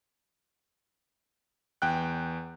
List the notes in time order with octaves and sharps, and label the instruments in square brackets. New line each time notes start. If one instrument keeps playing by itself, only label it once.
[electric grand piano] E2 G5 F#6